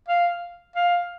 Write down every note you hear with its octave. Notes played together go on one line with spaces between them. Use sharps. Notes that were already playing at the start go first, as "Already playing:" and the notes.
F5
F5